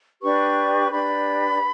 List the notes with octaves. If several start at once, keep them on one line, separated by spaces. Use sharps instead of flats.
D4 G4 B4 C#6
D4 G4 B4 B5